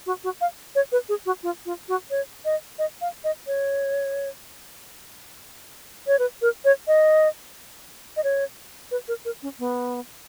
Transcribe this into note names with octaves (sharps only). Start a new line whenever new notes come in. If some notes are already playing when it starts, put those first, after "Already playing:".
F#4
F#4
F5
C#5
B4
G#4
F#4
F4
F4
F#4
C#5
D#5
D#5
F5
D#5
C#5
C#5
B4
A#4
C#5
D#5
D#5
C#5
B4
A#4
A#4
C#4
B3